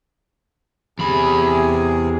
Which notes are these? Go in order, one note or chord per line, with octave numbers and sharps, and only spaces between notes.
E2 C3 G#4 B5